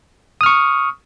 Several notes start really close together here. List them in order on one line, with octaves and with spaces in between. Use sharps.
D#6 F6 C#6